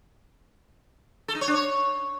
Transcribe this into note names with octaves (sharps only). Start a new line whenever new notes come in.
A4
D#4
C#5
D4
C#5